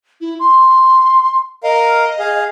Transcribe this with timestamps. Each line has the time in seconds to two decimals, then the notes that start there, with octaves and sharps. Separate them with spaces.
0.21 E4
0.39 C6
1.63 A#4 D#5 F5
2.19 G#4 F5